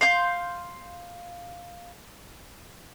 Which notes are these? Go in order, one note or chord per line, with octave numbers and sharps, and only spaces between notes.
F5 C6 G6